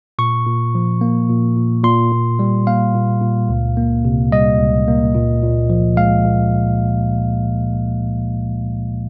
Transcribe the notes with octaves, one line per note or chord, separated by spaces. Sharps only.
A#2 C#6
A#2
F3
A#3
A#2
A#2
A#2 C6
A#2
G3
A#3 F5
A#2
A#2
C#2
A#3
C3
G3 D#5
C#2
A#3
A#2
A#2
F3
G#3 F5
A#2